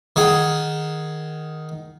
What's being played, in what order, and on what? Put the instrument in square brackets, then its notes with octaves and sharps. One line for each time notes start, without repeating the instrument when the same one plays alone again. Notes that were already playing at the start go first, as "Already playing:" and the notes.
[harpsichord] D#3 G#4 F#5